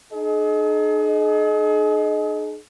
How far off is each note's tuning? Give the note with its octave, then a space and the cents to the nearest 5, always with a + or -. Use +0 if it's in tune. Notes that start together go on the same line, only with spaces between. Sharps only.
D#4 -45 G#4 +40 D#5 +0